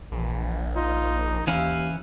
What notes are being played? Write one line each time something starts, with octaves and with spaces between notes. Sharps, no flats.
A#1 E3
D#4 F4
D#2 E3 C#4 E4 F5